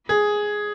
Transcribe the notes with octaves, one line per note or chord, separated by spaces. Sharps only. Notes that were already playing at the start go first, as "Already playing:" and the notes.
G#4